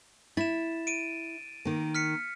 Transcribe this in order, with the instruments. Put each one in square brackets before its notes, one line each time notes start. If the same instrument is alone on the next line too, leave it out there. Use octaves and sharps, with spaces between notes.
[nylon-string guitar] E4 [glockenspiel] A6 E7
[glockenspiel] D7 D#7
[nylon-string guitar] D#3 A#3
[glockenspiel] F6 B6 C#7